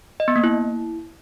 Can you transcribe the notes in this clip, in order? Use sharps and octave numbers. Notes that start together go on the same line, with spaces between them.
D#5
B3
A#3
E4